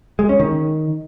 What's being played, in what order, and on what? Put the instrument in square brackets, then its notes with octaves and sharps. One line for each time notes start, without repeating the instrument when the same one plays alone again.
[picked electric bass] G#3
C#4
D#3